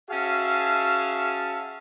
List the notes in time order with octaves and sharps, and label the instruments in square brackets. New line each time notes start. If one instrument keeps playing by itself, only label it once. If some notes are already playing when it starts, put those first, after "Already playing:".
[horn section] C#4 F#4 G#4 E5 F5 A5